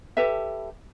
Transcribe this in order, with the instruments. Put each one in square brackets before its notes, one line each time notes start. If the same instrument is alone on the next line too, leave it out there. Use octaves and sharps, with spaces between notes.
[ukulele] G4 A4 B4 E5